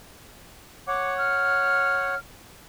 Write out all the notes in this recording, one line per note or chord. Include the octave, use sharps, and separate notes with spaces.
C#5 F#5 D6
F6